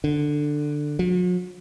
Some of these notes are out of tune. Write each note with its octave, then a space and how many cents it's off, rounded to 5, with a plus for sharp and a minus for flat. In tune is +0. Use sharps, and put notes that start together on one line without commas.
D3 +10
F#3 -45